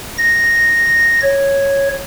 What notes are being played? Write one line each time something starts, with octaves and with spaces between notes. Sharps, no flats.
A#6
C#5